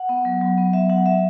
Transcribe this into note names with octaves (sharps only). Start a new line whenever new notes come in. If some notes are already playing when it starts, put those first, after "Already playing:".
Already playing: F#5
B3
F#3
F#3
B3
F#3 E5
F#3 F#5
F#3 E5